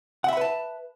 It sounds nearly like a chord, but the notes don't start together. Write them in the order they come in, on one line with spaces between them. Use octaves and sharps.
F#5 E5 B5 B4 A5